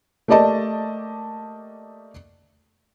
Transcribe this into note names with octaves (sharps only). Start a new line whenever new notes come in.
A3 A#3 G4 D5 D#5 A5